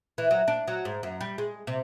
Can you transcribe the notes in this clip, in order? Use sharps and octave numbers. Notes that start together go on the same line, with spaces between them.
E3
F#3
D4
F#3
G#2
F#2
G3
G#3
C3